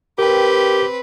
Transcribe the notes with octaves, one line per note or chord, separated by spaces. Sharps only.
C4 G4 A#4 B4 G5